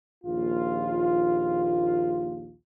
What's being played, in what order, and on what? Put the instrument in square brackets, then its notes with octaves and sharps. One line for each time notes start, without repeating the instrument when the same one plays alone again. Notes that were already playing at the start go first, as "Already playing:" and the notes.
[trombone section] A#1 D#2 F4